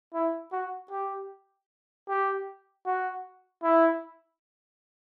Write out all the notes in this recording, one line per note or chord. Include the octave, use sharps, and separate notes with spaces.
E4
F#4
G4
G4
F#4
E4